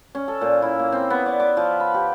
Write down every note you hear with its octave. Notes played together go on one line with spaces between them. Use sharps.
C#4
A4
A#2
E4
A#3
C4
B3
D5
D6
F3
B5
G4